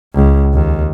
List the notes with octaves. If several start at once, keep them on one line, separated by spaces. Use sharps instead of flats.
C#2
D#2